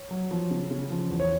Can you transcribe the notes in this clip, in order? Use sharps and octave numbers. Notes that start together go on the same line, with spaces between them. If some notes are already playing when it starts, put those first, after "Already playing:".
Already playing: C#5
F#3
F3
C#3
C#3
F3
E2
C#5